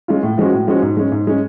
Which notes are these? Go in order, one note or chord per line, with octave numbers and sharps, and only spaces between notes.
G#3 C#4 F4
A2
F3 G#3 C#4 F#4
A2
F3 G#3 C#4 F#4
G#2
G#3 C#4
G#2
G#3 C#4